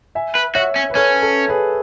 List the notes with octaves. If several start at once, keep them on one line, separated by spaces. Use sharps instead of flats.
E5 G#5
B4
F#4 C#5 E5
C#4
B4
C#4 A4 C#5
A4 C#5
G#4 B4